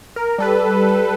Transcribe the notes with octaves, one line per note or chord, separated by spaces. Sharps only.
A#4
G3 A4 B4